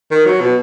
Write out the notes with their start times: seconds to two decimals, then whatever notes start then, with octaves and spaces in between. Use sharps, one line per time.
0.11 D#3
0.25 F#3
0.40 B2